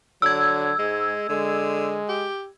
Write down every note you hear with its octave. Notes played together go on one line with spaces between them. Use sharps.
D3 F#3 E6 G#6
G#2 G#3
D3 G#3
G4